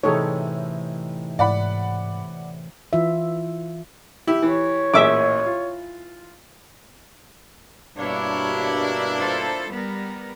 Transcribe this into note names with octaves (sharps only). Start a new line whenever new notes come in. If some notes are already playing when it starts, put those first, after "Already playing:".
A2 C3 E3 D#4 G#4 A4 C#5
G#2 D5 F#5 B5
E3 F4 E5
E4 G4
E3 C#5
A1 A#2 G#4 E5 D6
F4
G2 B2 G3 A#3 D4 E4 C#5
F4 A4 C5
G3 B3 A#4